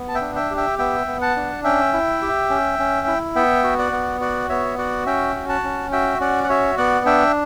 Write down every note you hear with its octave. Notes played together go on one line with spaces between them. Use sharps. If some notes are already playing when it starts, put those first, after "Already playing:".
Already playing: B3
A5
E5 G5
D4
E5 G5
G4
E5 G5
B3 E5 G5
B3
F#5 A5
D4
C#4 E5 G5
E4
G4
C#4
C#4
E4
B3 E5 G5
F#4
D5 F#5
B3
F#4 D5 F#5
B3 C#5 E5
F#4 D5 F#5
C#4 E5 G5
F#4
F#5 A5
C#4
F#4 E5 G5
C#4 D5 F#5
F#5
F#4 C#5 E5
B3 D5 F#5
D4 E5 G5